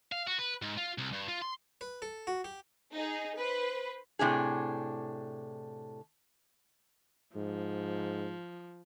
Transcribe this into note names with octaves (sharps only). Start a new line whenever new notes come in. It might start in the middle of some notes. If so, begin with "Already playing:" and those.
F5
F#4
B4
G#2
F4
C2
G2
F4
C6
B4
A4
F#4
G4
D#4 G#4
B4 C5
A2 C3 D4 G#4
G#2 F3